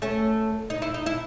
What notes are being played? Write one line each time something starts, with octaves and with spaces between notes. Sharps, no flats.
A3 C#4
D#4
E4
D#4
E4